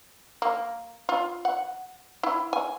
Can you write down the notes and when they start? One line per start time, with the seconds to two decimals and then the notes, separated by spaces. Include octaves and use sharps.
0.42 A#3
1.09 F4
1.45 F#5
2.23 E4
2.53 G#5